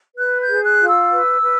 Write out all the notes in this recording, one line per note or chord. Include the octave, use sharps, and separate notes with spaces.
B4 F#6
G6
G#4
F#6
F4
E6
B4
B4